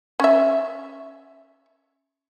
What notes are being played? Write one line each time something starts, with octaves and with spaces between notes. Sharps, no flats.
C#4 E5